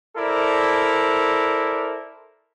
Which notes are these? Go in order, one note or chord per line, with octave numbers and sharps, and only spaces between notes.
E4 A4 A#4 C5 D5